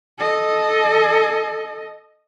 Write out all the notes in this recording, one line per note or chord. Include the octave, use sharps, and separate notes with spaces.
A4 D#5